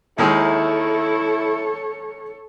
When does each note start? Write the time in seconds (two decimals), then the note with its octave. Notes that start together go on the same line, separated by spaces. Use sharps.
0.18 D#2 D#3 G#3 E4 A4 C#5